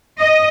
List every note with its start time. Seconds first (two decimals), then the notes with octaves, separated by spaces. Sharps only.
0.20 D#5